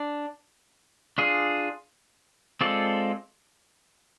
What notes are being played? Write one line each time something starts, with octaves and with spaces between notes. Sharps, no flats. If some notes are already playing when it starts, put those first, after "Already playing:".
Already playing: D4
D4 F4 G#4
G#3 C4 F4 A4 D5